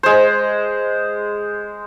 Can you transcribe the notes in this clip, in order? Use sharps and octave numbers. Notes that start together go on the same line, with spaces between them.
G#3 C5